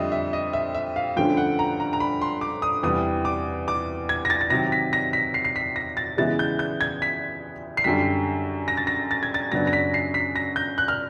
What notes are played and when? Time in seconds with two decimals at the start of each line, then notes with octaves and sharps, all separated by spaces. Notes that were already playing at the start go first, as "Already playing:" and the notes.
Already playing: F2 D3 G3 D#5 E5
0.12 E5
0.33 D#5
0.53 E5
0.75 E5
0.96 F5
1.16 G2 D3 F3 A3 C#4 G5
1.37 F#5
1.59 A#5
1.80 A#5
1.93 A#5
2.00 B5
2.22 C6
2.41 D6
2.62 D#6
2.83 E2 C3 E3 G3 D#6
3.25 D6
3.68 D6
4.09 G#6
4.25 A#6
4.30 A6
4.41 A6
4.50 C3 D#3 F#3 A#6
4.72 B6
4.93 A#6
5.13 B6
5.34 C7
5.45 C7
5.56 B6
5.76 A#6
5.97 A6
6.18 C#3 E3 G#3 B3 E4 A6
6.39 G6
6.59 G6
6.81 G#6
7.02 B6
7.77 C7
7.84 F#2 D3 G3 B6
8.68 A#6
8.77 A6
8.87 A#6
9.11 A6
9.23 G#6
9.34 A6
9.52 F#2 C#3 F#3 B3 D4 A#6
9.67 A#6
9.73 B6
9.94 C7
10.14 B6
10.36 A#6
10.56 G6
10.78 F#6
10.88 F6